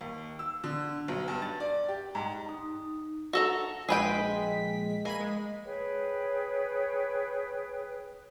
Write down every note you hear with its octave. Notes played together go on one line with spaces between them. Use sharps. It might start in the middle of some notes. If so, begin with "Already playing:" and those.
D#2
E6
D3
B1
G2
A6
D5
G4
G#2
D#4
F#4 A4 A#5
A#1 G#3 G#4 B4 G5 B6
A#3 G#5 B5 D#7
G#3
G#4 B4 C#5 G5